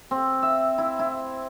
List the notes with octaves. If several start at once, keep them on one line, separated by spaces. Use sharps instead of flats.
C4
E5
E4
E4